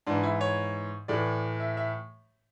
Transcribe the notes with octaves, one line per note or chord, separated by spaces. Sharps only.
G#2 E3 D4
E4
C#5
A2 E3 D5
E5
E5